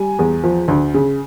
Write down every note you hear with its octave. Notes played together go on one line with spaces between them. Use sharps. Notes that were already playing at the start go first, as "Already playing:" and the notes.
Already playing: G3 G#5
E2
F3
D2
C#3